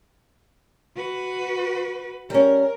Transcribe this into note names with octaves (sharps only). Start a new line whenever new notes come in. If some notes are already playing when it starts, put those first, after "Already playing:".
F#4 B4
G3 C#4 A#4